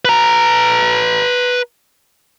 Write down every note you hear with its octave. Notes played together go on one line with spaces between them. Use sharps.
B4 A#5